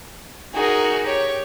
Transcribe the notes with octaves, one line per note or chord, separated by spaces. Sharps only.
D#4 F#4 G#4 A#4
G4 C#5